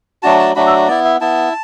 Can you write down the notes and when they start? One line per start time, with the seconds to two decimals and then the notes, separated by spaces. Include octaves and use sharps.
0.23 F#3 A3 D4 F#4 A5
0.39 A5
0.56 F#3 A3 D4 F#4 B5
0.67 A4
0.88 B3 E4 D5
1.05 E5
1.21 B3 E4 A5